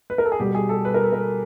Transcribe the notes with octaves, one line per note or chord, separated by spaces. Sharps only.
B4
A#4
A4
G#4
B2 G3 B3 G4
G#4
A4
B4
A#4
A4
A#4